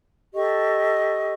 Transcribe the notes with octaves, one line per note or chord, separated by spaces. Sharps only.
G4 A4 D#5 C#6